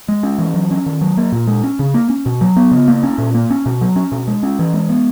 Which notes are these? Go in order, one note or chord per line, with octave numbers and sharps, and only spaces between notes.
G#3
C#4
E3
F#3
C#4
D#3
F#3
A#3
A#2
G#3
C#4
C#3
A#3
C#4
B2
F#3
B3
C#3
A#3
C#4
A#2
A#3
C#4
B2
F#3
C#4
B2
G#3
C#4
E3
G#3
B3